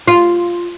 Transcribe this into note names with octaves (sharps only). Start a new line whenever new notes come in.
F4